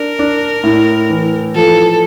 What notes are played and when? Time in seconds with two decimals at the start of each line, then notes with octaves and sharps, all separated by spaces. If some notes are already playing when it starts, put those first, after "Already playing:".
Already playing: D4 A#4
0.19 D4
0.64 A2
1.10 E3
1.55 F3 A4